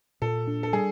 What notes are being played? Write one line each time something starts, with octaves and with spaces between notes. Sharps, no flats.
A#2 A4
D4
A4
G3 G#4